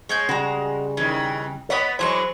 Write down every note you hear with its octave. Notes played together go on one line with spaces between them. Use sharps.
G#3 C#5 G#5 G6
C#3 G3 F#4 A#5
D#3 E3 C#4
B3 B4 C#5 D#5 F#5 B5
E3 F#3 G#3 C5 G#5 A#5 C#6